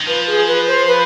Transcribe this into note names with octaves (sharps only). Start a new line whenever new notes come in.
D#3
F3 B4
G#4
B4
C5
B4